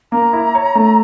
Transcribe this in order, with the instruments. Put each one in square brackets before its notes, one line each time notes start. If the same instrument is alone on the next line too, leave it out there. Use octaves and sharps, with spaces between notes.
[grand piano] A#3 [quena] A#5
[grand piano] E4
C#5
A3